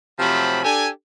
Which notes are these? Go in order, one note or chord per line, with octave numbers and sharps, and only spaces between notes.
C3 F3 F#3 A3 G4 B5
D4 G4 A4 G#5